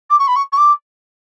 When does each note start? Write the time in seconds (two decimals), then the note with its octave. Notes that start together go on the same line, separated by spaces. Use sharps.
0.10 D6
0.19 C#6
0.27 B5
0.36 C#6
0.52 C#6
0.57 D6